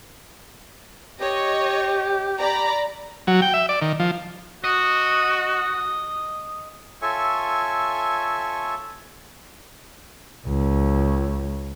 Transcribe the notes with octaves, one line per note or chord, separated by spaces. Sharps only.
G4 C#5 D#5
D5 A#5 B5
F#3
G5
E5
D5
D#3
F3
F#4 D#5
F4 A4 C#5 E5 G#5 C#6
C#2